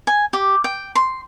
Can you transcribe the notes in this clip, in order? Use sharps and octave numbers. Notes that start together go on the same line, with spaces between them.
G#5
G4
G5
C6